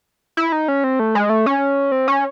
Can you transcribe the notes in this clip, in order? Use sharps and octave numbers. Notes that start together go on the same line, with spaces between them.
E4
D#4
C#4
C4
A3
G#3
A3
C#4
C4
C#4